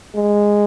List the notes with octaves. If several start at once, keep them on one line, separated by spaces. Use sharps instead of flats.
G#3